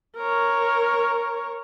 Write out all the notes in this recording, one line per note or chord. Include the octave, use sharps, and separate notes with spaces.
A#4 C#5